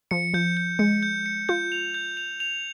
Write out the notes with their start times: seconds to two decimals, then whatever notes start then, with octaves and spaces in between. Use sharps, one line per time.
0.11 F3 C#7
0.34 F3 G6
0.57 G6
0.79 G#3 C#7
1.03 G6
1.26 C#7
1.49 F4 G6
1.72 F7
1.94 G6
2.17 F7
2.40 F7